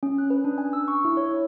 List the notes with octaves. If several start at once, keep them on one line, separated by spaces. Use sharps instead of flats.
C#4
F#6
B4
D4
G#5
E6
C#6
E4
C#5
E4